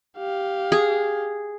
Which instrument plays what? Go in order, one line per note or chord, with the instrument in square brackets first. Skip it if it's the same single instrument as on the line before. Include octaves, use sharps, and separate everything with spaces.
[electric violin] G4 F5
[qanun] G#4